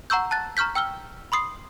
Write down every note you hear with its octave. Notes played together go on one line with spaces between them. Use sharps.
F#5 A#5 C#6 E6 G6
A5 F#6 A6
A#5 C#6 F6 G6 B6
G5 E6 F6 G7
B5 C6 D#6 C7